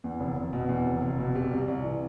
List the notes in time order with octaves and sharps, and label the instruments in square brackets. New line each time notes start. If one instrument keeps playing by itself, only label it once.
[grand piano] E2
F1
F1
B2
E2
F1
F1
B2
C3
C2
C2
E3